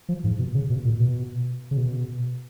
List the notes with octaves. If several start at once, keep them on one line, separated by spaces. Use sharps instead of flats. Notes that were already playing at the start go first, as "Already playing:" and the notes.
F3
G#2
B2
C#3
B2
A#2
B2
C#3
B2